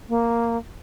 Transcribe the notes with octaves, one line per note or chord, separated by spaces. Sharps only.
A#3